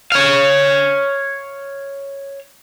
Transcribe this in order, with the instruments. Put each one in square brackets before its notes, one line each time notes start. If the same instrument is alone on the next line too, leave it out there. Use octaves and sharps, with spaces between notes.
[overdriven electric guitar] C#5 F5